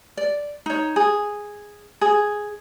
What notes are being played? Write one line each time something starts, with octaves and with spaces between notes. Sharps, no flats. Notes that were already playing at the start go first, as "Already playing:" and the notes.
D5
D#4 C#5
G#4
G#4